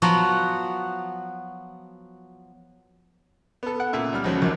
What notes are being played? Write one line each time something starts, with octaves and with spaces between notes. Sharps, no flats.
F3 F#3 B3 F#4
B3 A4
F#5
A#2 C#3 E5
C#2 G3 F6
C#2 C#3 F3 F#3
A#1 D#2 F#3